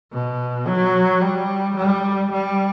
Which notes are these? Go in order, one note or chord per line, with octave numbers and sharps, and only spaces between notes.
B2
F#3
G3
G3
G3